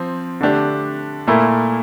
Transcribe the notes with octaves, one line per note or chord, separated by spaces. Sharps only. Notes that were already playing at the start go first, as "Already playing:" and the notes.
Already playing: F3 C4
D3 A3 D4 G4
A#2 A3 E4 A#4